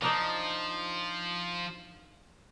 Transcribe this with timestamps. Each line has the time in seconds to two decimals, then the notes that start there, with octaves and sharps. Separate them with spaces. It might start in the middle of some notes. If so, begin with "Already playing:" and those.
0.02 F3 D4 D#4 D5